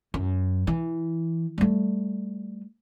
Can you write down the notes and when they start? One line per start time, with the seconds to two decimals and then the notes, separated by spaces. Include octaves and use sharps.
0.14 F#2
0.67 E3
1.58 G3 A3